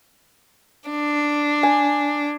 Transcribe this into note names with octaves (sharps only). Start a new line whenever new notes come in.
D4
G#5